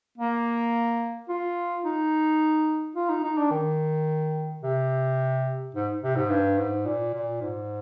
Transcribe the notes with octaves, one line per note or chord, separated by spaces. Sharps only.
A#3
F4
D#4
F4
D#4
D#4
D4
D#3
C3
G#2
C3
G#2
G2
G#2
A#2
A#2
G#2